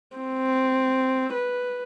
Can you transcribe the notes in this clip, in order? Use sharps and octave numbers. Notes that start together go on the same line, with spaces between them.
C4
B4